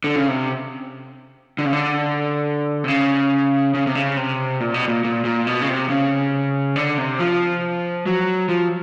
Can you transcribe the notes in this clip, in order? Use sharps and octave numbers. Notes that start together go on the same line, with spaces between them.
D3
C#3
C3
D3
C#3
D3
C3
C#3
C#3
C3
C#3
C3
A#2
B2
A#2
A#2
A#2
B2
C#3
C3
C#3
D3
C3
F3
F#3
F3